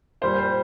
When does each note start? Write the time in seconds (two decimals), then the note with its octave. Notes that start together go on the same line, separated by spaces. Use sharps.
0.21 A#2 G3 A#3 C5
0.38 C5